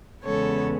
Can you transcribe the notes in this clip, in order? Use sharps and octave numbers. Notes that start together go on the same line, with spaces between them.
E2 C#3 G#3 B3 A4 C#5